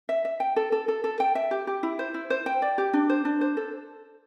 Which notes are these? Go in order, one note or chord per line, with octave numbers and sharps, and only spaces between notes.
E5
E5
G5
A4
A4
A4
A4
G5
E5
G4
G4
E4
C5
E4
C5
G5
D5
G4
D4
C5
D4
C5
A4